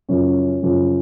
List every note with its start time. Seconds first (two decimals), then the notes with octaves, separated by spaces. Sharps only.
0.09 F#2 C#3 F3 C#4
0.62 F#2 C#3 F3